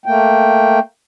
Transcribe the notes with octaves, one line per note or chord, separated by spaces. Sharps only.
A3 A#3 G5